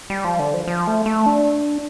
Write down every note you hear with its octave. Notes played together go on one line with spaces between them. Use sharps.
G3
F3
D3
F3
F3
A3
A3
D4